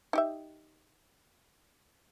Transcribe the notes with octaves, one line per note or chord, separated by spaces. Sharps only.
D#4 G4 E5